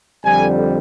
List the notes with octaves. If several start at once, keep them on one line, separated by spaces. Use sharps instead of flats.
F2 D3 G3 G#5